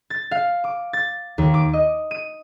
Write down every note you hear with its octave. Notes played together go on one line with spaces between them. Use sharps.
A6
F5
D6
A6
D#2
D6
D#5
D#7